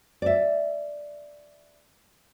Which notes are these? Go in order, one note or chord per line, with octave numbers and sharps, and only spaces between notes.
D5 E5